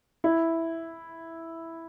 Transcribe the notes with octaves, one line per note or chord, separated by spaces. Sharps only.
E4